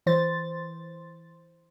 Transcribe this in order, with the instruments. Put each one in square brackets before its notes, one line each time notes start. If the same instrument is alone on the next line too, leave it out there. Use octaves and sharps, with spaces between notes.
[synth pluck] E3 C5 A6